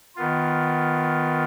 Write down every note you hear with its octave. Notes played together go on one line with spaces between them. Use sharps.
D#3 B3 F4